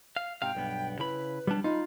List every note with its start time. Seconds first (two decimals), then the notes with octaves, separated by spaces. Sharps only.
0.16 F5
0.42 G#2 C3 F5 G5
0.55 B1 G2 B3
0.99 C#3 E4 B4 B5
1.47 G3 B3 D4
1.64 D#4 F4 B5